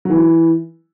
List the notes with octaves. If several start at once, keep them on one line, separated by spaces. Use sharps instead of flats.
F#3
E3